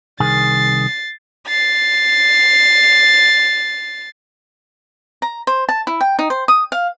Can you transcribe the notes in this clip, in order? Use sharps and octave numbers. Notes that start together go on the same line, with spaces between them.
C2 D#3 G#4 A6 C7
A6 C7
A#5
C5
A5
E4
G5
D#4
C5
D#6
F5